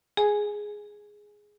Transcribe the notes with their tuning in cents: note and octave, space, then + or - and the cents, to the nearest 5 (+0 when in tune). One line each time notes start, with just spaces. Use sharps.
G#4 +0 G#5 +0